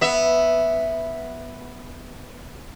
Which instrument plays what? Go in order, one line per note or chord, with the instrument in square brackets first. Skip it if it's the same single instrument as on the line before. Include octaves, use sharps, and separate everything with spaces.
[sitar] B3 E5